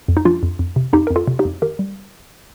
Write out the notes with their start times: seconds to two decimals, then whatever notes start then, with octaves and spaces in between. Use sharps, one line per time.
0.08 F2
0.17 D#4
0.25 F3 D4 F4
0.43 F2
0.59 F2
0.76 C3
0.93 F2 D#4 G4
1.07 F2 A#4
1.16 F4 A4
1.28 C3
1.39 D#4 G4
1.45 F2
1.62 D#3 G4 A#4
1.79 G3